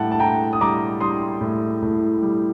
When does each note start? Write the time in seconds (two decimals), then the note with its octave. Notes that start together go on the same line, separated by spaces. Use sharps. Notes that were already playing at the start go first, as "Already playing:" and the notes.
Already playing: A2 G3 F#5 G5 A5
0.11 A5
0.20 A2 G5 A#5
0.53 D#6
0.61 G3 A#5 D6
1.00 G3 C6 D#6
1.41 A2
1.82 A2
2.22 G3